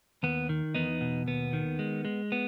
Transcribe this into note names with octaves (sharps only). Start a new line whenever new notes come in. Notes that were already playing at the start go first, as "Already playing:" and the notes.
D#2 B3
D#3
E2 B3 D#4
B2
D#2 B3
D#3
G#3
G#3
B3